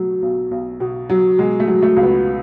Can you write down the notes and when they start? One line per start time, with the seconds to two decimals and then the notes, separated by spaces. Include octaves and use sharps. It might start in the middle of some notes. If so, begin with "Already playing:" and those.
Already playing: B2 F#3 A3
0.22 B1
0.51 B1
0.80 B2
1.10 F#3
1.39 B2 G#3
1.60 A3
1.67 F#3
1.83 A3
1.97 C#2
2.03 B3